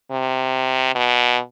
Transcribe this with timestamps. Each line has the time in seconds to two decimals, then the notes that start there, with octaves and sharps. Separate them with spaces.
0.11 C3
0.95 B2